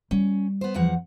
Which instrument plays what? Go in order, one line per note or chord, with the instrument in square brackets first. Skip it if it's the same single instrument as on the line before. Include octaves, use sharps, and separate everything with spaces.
[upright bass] G3 [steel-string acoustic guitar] C#4
[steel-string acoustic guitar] B3 C5
E2 F3 F#5